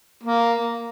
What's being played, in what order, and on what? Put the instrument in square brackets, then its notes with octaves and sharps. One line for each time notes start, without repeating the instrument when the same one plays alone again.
[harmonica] A#3